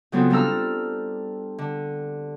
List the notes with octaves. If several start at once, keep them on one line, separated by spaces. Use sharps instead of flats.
C#3 F#3 B3 C4 F4 A4
G3 D4 A4 A#5 E6 F6
D3